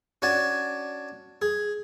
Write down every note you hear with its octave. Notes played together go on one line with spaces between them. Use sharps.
C#4 D4 F#4 G#5 A5
G#4